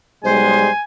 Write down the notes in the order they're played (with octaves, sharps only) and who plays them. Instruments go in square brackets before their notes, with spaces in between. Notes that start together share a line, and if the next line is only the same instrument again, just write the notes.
[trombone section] B1 G3 G#3 [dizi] C5 [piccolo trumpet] G#5